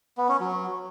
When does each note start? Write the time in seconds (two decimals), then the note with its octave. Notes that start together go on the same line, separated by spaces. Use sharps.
0.18 B3
0.29 C#4
0.40 F#3